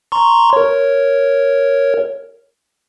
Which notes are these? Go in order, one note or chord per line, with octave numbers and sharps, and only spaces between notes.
A#5 C6 C#6
A#4 C#5